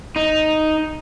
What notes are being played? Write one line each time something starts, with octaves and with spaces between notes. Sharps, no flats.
D#4